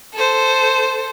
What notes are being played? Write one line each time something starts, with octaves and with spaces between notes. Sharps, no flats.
A4 C5